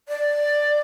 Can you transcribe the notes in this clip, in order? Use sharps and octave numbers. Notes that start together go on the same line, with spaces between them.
D5